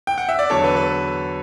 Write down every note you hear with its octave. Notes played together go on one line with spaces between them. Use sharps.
G5
F#5
E5
D5
E2 D3 F#3 A4 C#5
B4
B4